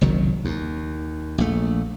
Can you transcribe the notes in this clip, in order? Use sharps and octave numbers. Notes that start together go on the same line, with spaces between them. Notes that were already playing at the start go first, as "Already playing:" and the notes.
F#1 C2 D#3 F#3
D#2
A#1 A3